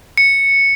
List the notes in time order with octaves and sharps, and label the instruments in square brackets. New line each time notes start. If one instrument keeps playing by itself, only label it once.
[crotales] C#7